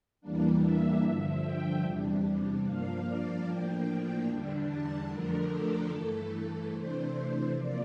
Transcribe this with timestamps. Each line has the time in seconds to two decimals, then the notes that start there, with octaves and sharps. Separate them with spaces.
0.21 E2 E3 G3 A#3 D4
0.61 E5
1.02 G2 D3 F3 E5
1.42 G5
1.84 E2 C3 G3 D4
2.64 G2 F3 A#3 D4 F5
3.06 D5
3.46 A2 F3 A#3 D4 G5
4.28 E2 D3 G3 D4
4.68 A5
5.08 F2 D3 F3 A3 D4 A#4
5.50 A4
5.89 G2 E3 A3 A4
6.31 A4
6.72 C3 E3 A3 D4 C5
7.53 C3 F3 A#3 D5